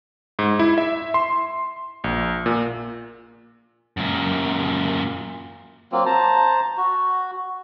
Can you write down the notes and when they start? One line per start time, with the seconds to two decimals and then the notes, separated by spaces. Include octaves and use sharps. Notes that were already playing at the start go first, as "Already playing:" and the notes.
0.39 G#2
0.59 E4
0.78 E5
1.14 C6
2.04 A#1
2.46 A#2
3.97 F#2 A#2
5.92 F#3 A#3 C4 F4
6.06 C5 A5 A#5
6.77 F#4